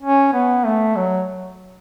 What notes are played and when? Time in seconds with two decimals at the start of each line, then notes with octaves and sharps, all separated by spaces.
0.02 C#4
0.33 B3
0.65 A3
0.96 F#3